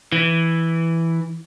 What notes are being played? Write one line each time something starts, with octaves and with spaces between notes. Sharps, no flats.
E3